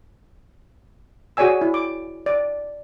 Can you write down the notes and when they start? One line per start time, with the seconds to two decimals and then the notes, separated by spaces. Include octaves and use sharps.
1.37 F#4 G#4 C#5 D5 G#5 E6
1.61 E4
1.74 D6
2.26 D5